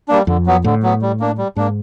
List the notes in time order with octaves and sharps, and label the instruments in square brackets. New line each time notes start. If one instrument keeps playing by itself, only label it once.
[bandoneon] G3 A#3 D4
[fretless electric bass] F2 [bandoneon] D3
[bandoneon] F#3 B3
[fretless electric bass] A2 [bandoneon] D3
[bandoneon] F#3 B3
G3
A#3 D4
G3
[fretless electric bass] G#2 [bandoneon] A#3 D4